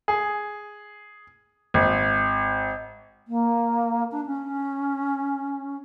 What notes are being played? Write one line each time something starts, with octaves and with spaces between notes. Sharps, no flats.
G#4
G#1
A#3
D4
C#4